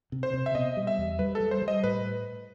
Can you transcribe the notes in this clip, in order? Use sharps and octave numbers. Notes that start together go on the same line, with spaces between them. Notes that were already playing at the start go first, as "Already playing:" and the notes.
C3
C5
C3
E5
B2 D#5
G3
E5
E2
G3 B4
A4
G3
C5
G3
D#5
A2 B4